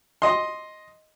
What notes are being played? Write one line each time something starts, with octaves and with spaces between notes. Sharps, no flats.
D#5 C6